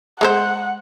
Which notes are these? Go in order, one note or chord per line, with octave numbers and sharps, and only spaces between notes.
G#3 A4 C5 F#5